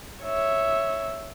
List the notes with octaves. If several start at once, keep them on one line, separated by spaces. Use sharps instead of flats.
C#5 E5